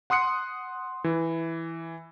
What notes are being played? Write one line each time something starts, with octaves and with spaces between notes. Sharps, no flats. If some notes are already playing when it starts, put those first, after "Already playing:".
F#5 C6 D#6 F#6 C#7
E3